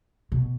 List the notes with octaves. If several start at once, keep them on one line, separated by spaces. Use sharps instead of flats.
B2